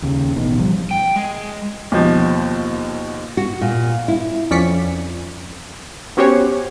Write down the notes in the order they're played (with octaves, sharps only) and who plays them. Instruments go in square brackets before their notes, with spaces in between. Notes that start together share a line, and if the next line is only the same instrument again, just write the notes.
[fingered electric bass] D#2 C#3
A1 B2 D#3
G#1 F3 G3
[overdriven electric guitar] G5
G#3
[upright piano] D#2 B2 F3
[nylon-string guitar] F#4
A#2
E4
[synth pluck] F2 C#4 D5 B6 C#7
B3 C#4 F#4 G4 C5 C#5